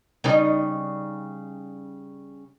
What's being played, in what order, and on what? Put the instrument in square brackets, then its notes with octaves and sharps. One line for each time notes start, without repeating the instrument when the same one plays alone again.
[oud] C#3 G3 D#4